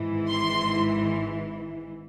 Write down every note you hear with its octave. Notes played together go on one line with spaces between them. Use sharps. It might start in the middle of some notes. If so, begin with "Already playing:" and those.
Already playing: G#1 G#2 E3
C6